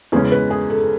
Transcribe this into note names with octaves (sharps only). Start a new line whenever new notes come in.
E2 C#3 G#3 C#4 G#4
B4
G#4
A4